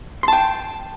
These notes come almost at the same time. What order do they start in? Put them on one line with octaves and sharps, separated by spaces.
C6 A5 G5